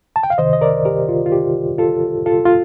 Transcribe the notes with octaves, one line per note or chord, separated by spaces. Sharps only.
A5
G5
F5
C2 C3 D#3 C5 D#5
D#5
A#4 D5
G4 A#4
F4
F4
G4
F4 A4
F4 A4
F4